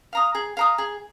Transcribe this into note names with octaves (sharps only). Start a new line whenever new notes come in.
F5 A#5 D#6
G#4
F5 A#5 D#6
G#4